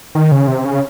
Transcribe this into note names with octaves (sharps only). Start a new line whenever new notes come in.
D#3
C#3
C3
C#3